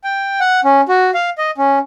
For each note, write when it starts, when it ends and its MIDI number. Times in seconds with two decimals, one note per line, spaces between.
0.04 0.40 79
0.40 0.60 78
0.64 0.81 61
0.88 1.11 66
1.14 1.30 77
1.38 1.51 75
1.58 1.79 61